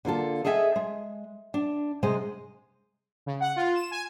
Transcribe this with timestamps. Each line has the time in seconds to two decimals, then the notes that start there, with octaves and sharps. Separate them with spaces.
0.05 D3 A#3 F4 A4
0.45 G#4 A4 D#5 E5 G5 G#5
0.76 G#3
1.54 D4
2.03 C3 G#3 C5 D#5
3.26 C#3
3.40 F#5
3.56 F4
3.75 E7
3.91 G#5